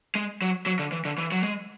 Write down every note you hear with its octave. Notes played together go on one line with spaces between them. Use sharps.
G#3
F#3
F#3
D3
E3
D3
E3
F#3
G#3